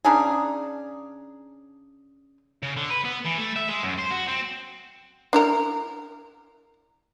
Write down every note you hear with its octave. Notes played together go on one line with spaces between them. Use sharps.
C#3 D4 D#4 G#4
C#3
D3
B4
B3
E3
A3
E5
G#3
F#2
C5
F#4
C4
D4 E4 A#4